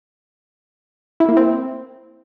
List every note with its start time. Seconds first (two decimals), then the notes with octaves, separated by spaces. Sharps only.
1.20 E4
1.29 A#3
1.37 C4